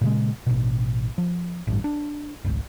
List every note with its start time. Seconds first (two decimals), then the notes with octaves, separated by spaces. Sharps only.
0.01 A#2 C#3 G#3
0.47 A1 B2
1.18 F3
1.67 A1 G2
1.84 D4
2.45 D#1 G#1 C#2